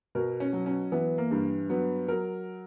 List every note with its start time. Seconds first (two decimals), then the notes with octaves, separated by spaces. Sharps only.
0.15 B2 A#4
0.40 C#4
0.53 F#3
0.66 C#4
0.92 E3 B3
1.18 A#3
1.31 G2
1.70 F#3 B3
2.08 F#3 A#4